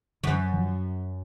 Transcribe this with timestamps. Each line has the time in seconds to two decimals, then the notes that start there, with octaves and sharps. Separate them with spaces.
0.23 F#2 D3 E3
0.53 D#3 F3